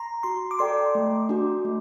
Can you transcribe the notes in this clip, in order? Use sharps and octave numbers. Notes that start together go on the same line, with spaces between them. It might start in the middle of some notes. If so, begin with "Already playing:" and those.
Already playing: A#5 C6
F#4 C6
D6
A4 D5 G5 C6
A3
D4 F#4
A3